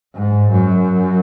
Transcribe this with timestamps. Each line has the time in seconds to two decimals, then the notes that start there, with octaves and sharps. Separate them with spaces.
0.15 G#2
0.51 F#2